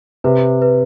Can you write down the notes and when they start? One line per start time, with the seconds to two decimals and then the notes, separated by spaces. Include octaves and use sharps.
0.24 C3 B4
0.62 B4